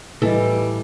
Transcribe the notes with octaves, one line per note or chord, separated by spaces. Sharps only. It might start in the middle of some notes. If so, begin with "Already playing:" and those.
A2 E3 G3 A4 B4 D#5